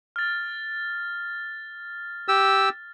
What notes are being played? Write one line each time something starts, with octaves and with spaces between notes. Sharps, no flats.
F6 A6
G4 E6